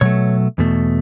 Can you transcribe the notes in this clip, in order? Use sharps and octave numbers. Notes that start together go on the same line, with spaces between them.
B2 F#3 A3 C#5
E2 B2 A3